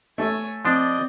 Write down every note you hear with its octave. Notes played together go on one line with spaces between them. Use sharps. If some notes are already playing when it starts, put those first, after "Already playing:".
A3 C#5 G#5
F3 C4 D4 D5 D#5 G6